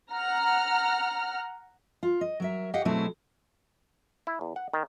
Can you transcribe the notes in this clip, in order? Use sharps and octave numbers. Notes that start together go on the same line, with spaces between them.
F#5 A#5 F6
F4
D#5
F#3 A#4 E5
G4 D#5 F5 F#5
B2 F#3 A3 C4 E4 G#4
E4
E2
F#5
D#3